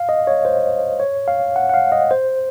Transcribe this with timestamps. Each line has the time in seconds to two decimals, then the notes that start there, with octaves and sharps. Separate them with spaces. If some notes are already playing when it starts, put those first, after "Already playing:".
Already playing: F5
0.09 D#5
0.27 C#5
0.45 C5
1.00 C#5
1.28 F5
1.56 F#5
1.69 F#5
1.74 F5
1.92 D#5
2.11 C5